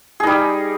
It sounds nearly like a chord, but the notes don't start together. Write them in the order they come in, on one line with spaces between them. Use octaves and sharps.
G#4 D#4 G3